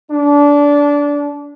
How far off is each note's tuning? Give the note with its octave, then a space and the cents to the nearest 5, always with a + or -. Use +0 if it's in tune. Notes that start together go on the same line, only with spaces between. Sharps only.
D4 -20